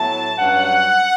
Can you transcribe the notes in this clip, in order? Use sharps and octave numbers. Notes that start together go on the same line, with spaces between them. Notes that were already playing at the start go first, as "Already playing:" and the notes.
Already playing: A2 F#3 B3 E4 A5
G2 F#3 C#4 F#5